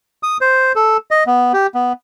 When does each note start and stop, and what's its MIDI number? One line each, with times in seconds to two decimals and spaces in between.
0.23 0.37 87
0.41 0.72 72
0.76 0.97 69
1.11 1.24 75
1.27 1.52 59
1.54 1.67 67
1.74 1.93 59